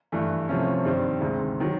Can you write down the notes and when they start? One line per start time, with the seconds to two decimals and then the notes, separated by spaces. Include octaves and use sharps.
0.12 G2 E3 A3
0.49 C2 C3 F3 A3 C#4
0.85 G2 D#3 G3 C4
1.21 D2 C3 D#3 G#3
1.60 D#3 F#3